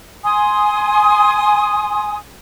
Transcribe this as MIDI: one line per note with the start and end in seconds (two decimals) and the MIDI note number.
0.24 2.16 80
0.24 2.16 84
0.24 2.16 87